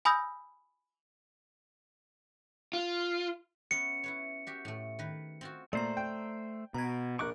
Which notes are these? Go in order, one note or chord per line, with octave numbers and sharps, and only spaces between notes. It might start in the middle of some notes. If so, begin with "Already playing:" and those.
G#5 B5 D#6 E6 G6 A#6
F4
B3 C#4 E5 C#7
E4 B4 C#5
F#4 G4 E5
A2 A3
D#3 B4
C4 F4 F#4
A#2 A3 C5 D5 A#5
G5
B2 A#5 G#6
A#1 A#4 C#6 D6 F#6 D7